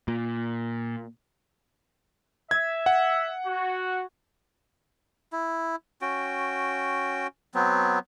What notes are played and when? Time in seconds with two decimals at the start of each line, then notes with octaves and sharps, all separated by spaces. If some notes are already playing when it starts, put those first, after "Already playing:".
0.08 A#2
2.51 E5 G#6
2.86 F#5
3.45 F#4
5.33 E4
6.02 C#4 F#4 G5
7.55 F#3 B3 C4